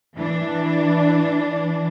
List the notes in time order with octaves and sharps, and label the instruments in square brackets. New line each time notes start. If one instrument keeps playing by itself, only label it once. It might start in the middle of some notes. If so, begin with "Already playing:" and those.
[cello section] E3 D4